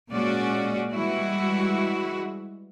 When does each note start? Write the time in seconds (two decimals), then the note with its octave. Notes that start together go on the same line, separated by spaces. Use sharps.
0.11 A#2 G#3 C#4 F#4 D5
0.93 E3 G3 G#3 E4 F#4